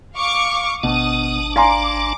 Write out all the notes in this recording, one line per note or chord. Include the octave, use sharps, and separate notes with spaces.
F5 C#6 D6
G#1 B2 D4 A5 D#6
D5 F5 G#5 A#5 C6 D6